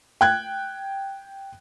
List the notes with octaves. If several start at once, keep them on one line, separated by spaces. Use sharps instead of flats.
G5 F#6 G#6